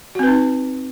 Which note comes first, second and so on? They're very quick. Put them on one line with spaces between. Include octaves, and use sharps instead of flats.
F#4 C4 B4 D#4